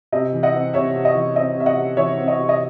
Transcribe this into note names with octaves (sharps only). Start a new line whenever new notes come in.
C3 D#5
E3
D#5 F#5
C4
C3 C#5 E5
C3
D#5
E3
C4 D#5
C3 E5
D#5 F#5
C3
E3 C#5 E5
C4
D#5
C3
D#5